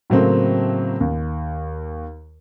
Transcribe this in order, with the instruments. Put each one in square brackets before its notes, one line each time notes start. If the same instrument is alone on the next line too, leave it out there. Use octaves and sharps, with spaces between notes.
[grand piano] A2 C#3 F#3 A3 A#3 C4
D#2